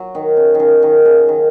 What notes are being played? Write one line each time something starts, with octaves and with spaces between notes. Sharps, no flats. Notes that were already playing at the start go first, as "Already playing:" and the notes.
Already playing: F#3
D#3
C#3
D#3
C#3
D#3
C#3
D#3